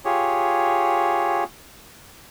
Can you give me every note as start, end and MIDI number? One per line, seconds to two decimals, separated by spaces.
0.05 1.44 65
0.05 1.44 67
0.05 1.44 68
0.05 1.44 73